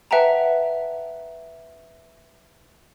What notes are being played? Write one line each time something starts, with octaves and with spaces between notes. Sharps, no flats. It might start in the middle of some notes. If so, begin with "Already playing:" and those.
B4 E5 F#5 G5 A5 A#5